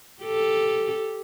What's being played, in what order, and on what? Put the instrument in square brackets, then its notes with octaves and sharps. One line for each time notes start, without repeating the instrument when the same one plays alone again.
[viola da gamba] G4 A4